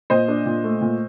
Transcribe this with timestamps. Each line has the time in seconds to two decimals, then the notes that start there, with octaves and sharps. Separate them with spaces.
0.10 A#2 C5 D#5
0.28 D4
0.46 A#2
0.64 A3
0.81 A#2